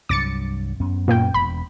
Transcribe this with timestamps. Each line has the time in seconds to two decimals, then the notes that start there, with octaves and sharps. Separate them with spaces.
0.09 C2 G2 F#3 D6 A6 C#7
0.80 F#2 B3 C#4
1.08 A#2 A#3 G5
1.34 E1 B5